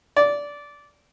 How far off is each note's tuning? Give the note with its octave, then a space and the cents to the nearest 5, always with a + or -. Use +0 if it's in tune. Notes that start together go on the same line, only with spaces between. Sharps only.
D5 -15